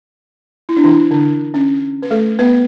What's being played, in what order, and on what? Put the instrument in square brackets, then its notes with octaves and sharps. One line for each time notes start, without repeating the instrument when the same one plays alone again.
[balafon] E4
D4
E3 E4
D3 D4
C#4
B4
A3 A4
B3 B4